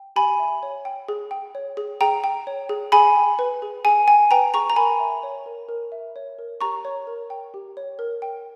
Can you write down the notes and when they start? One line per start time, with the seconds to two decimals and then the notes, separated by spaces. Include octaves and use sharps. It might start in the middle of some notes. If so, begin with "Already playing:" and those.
Already playing: G5
0.16 G4 G#5 B5
0.39 E5
0.63 C#5
0.85 G5
1.09 G#4
1.31 G5
1.55 C#5
1.77 G#4
2.01 G#4 G5 A#5
2.24 G5
2.47 C#5
2.69 G#4
2.92 G#4 G#5 B5
3.16 G5
3.39 B4
3.62 G#4
3.85 G#4 G#5
4.07 G5 G#5
4.31 B4 G5 A#5
4.54 G#4 A#5 C#6
4.70 A#5
4.76 A#4 G#5 B5
5.00 E5
5.23 C#5
5.46 A#4
5.69 A#4
5.92 E5
6.16 C#5
6.39 A#4
6.61 G4 A#5 C#6
6.85 C#5
7.07 A#4
7.30 G5
7.54 G4
7.77 C#5
7.99 A#4
8.22 G5